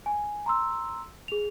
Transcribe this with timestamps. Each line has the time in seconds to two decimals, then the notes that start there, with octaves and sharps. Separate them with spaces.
0.06 G#5
0.46 A#5 C6 E6
1.28 G#4 F7